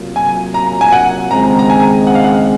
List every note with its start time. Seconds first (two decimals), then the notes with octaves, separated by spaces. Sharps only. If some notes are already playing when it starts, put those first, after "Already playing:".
Already playing: C3 F#3 A#3 F4
0.16 G#5
0.54 A#5
0.81 G#5
0.92 F#5
1.31 D#2 C#3 G#3 C4 A#5
1.59 A#5
1.70 G#5
2.07 F#5
2.15 F5
2.24 F#5